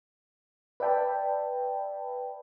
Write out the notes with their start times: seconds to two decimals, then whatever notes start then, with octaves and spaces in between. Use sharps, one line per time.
0.80 B4 D5 E5 G5 A5 B5